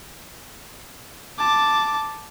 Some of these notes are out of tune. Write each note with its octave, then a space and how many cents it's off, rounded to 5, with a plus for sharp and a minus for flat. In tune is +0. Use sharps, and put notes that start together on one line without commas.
A5 +0 D6 +0